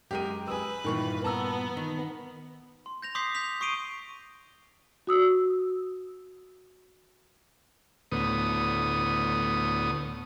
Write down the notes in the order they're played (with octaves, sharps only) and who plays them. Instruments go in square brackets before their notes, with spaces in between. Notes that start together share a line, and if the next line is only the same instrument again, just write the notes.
[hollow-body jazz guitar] F#2 G#3 A#4 [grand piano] G4 D#7
[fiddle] B4 [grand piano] G#5 D#6 E6
[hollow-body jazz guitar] G2 A#2 E3 [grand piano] D#3 A#4 C#6
[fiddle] B3 [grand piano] A5 A#5 E6
[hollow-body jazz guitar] D#3
[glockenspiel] C6
G6 A#6 F7
C6 D6 D#6 G6 B6 C7
G6 B6 F7
C#6 D#6 C7 D7 D#7 G7
[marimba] F#4 D#6 E6
[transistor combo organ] D2 A2 B3 D#6